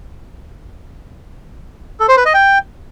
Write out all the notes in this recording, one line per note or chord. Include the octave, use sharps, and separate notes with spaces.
A4
C5
B4
D#5
G5